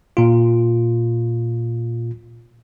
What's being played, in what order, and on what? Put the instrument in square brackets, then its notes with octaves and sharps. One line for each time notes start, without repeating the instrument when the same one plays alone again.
[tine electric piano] A#2 F4